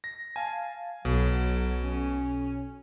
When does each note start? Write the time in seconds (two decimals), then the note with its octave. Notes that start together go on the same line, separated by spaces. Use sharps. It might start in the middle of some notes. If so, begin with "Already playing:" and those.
0.04 A#6
0.36 F5 G#5 A5
1.05 B1 B2 F#3
1.81 C#4